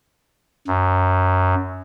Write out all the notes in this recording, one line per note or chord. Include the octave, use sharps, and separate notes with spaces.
F#2